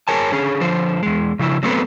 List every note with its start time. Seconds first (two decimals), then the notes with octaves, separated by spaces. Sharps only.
0.08 G#4 A#4 C#5 G#5 A5
0.32 D3 C#4 G#4
0.61 D3 F3 C5
1.03 E2 G#3
1.39 C#3 F3 E4
1.63 F#3 A3 B3 C4 A4 B4